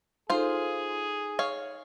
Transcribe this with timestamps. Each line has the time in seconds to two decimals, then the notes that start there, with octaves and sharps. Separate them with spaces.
0.30 D#4 F4 G#4 A4 C5
1.39 C#5 F5